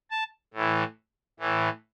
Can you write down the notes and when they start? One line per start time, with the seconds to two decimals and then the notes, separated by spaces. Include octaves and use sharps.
0.11 A5
0.54 A2 E3
1.40 A2 E3